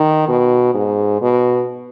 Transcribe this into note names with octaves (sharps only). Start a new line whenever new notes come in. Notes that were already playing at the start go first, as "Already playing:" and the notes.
Already playing: D#3
B2
G#2
B2